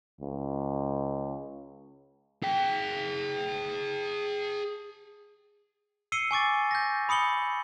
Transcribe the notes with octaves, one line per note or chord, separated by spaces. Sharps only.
C#2
G#4 G5
E6 C7 C#7 D#7 G7
G#5 C#6 D6 A6
G6 A#6
B5 D#6 C#7 F#7 G7